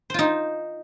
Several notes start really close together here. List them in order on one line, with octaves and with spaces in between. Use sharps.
C5 F4 D#4